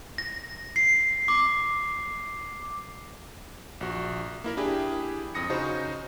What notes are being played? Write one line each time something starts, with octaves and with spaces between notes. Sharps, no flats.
A#6
C7
D6
A#1 F#4
A#3 E4 A#4
D4 E4 G4 G#4
F2 D#6 A#6 C#7
C#3 D#4 F#4 C5